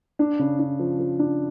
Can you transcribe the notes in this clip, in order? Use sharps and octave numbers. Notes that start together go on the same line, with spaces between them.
D4
C#3
D4
F3
F3
D4